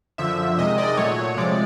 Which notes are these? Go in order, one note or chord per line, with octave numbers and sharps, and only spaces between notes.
F#2 D3 F3 E5
C3 D#3 G#3 D#5
D5
A#2 F#3 A3 C#5
C3 F3 G#3 D5